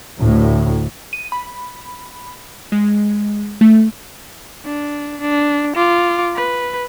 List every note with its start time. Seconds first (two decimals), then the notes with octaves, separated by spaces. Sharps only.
0.20 D2 A2
1.13 D#7
1.32 B5
2.72 G#3
3.61 A3
4.65 D4
5.21 D4
5.76 F4 D6
6.36 B4